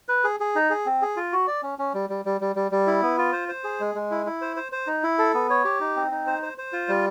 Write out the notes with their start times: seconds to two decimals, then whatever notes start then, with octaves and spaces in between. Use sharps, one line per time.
0.09 B4
0.24 G#4
0.40 G#4
0.55 D#4
0.70 G#4
0.86 C4
1.02 G#4
1.17 F4
1.32 F#4
1.47 D5
1.63 C#4
1.79 C#4
1.94 G3
2.10 G3
2.25 G3
2.41 G3
2.56 G3
2.71 G3
2.87 E4
3.02 B3
3.18 F4
3.33 C5
3.48 C5
3.64 G#4
3.80 G#3
3.95 G#3
4.11 E4
4.26 E4
4.41 C5
4.56 C5
4.72 C5
4.87 D#4
5.03 E4
5.18 A4
5.34 B3
5.50 C#5
5.65 G4
5.81 D#4
5.96 C4
6.11 D#4
6.27 C5
6.43 C5
6.58 C5
6.73 F4
6.89 G3